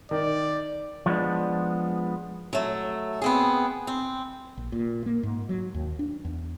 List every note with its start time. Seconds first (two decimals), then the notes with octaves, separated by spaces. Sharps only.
0.11 D#3 D5
1.06 F3 G#3 B3 D4
2.53 F#3 A3
3.22 B3 C4 G#4
3.87 C4
4.57 A#1
4.72 A#2
5.06 A#3
5.23 G#2
5.49 F#3
5.74 D#2
5.99 D4
6.25 E2